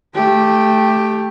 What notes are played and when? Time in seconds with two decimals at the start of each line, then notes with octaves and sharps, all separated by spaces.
0.14 A3 G4